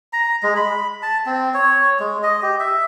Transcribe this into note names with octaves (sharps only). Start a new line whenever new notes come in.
A#5
G#3
B5
A5
C4
C#5
G#3
D#5
G4
E5